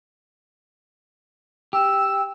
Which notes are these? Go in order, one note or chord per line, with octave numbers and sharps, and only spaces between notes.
G4 E6